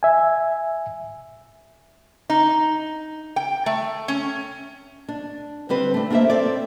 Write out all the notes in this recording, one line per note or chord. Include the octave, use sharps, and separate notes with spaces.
E5 G#5
D#4
G5
A3
C#4
D4
D3 G3 C4 B4
A3 D4
A#3 D4 A4 C5 E5
C4 A4 D5